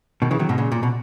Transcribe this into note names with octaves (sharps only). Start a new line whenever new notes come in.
B2 D#3
C#3 E3
D#3 F#3
G#2 B2
A#2 C#3
A#2
B2